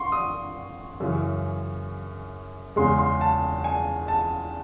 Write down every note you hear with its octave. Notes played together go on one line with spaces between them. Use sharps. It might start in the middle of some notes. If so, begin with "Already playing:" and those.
Already playing: C6 C#6
D#6
F#2 C#3 E3
E2 C#3 G#3 C6
C6
A5
G#5
A5